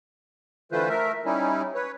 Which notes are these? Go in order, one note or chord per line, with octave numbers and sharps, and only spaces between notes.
D3 E3 A3 F4 B4 C5
A3 A#4 E5
G3 C#4 D#4 E4
B4 C#5